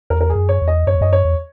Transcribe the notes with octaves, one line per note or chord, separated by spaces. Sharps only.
E2 A#4
A#4
G#4
F#2
C#5
E2
D#5
F#2 C#5
E2
F#2 D#5
C#5
E2